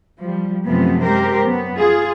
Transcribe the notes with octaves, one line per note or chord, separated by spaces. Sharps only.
F3 G3
F#2 C3 F3 A3 B3 C4
G#3 G4 A#4 C5
F#2 B3
F4 G#4